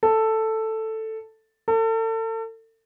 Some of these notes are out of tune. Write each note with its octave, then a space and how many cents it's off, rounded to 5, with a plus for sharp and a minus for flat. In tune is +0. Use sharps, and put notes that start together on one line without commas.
A4 +5
A4 +35